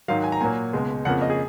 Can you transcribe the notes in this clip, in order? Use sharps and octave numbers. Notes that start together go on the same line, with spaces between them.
G#2 D#3 F#3 F5
G#5
A#5
A#2 F#3 A#3 G#5
C#2 B2 G#3
F2 C#3 F3 A#3 F#5
D#5
G#4